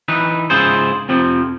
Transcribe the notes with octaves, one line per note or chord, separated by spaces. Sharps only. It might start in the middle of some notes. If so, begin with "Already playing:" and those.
E3 D#4 B4
G#2 C#3 E4 F4 G#4 C5
F2 C3 F3